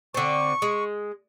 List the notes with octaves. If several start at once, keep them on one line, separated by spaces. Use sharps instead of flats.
D3 C4 C#6
G#3